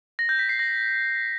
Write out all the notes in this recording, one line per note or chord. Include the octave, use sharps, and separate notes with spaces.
A#6
G6
B6
C7
A#6